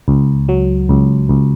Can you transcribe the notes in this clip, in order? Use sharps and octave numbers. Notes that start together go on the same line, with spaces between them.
C#2
F#3
C#2
C#2